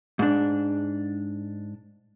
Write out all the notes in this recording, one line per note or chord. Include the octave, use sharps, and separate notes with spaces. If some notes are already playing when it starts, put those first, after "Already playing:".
G#2 D4